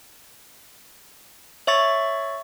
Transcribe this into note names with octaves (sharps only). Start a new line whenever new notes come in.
C#5 E5 C#6 A6